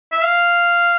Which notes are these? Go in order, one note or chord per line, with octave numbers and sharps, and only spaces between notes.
E5
F5